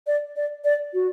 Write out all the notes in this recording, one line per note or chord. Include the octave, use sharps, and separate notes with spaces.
D5
D5
D5
F#4